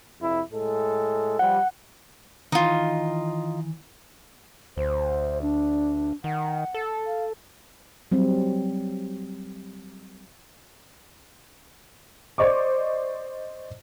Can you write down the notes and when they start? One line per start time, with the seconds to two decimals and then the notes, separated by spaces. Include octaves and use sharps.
0.21 F2 C3 E4
0.51 A2 G#3 A4
1.39 F3 G3 F#5
2.52 D#3 E3 D#4 F4
4.77 D2 C5
5.42 D4
6.24 D#3 F#5
6.74 A4
7.07 F5
8.12 F#3 G3 C4
12.38 C5 D5 D#5 C#6 D6